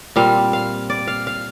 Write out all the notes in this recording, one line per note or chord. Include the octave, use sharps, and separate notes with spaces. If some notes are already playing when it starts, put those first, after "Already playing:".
A#2 G3 C4 F5
F5
D5
F5
F5